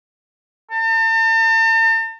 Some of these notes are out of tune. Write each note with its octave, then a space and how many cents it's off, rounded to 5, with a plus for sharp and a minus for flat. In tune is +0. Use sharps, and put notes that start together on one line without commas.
A5 +45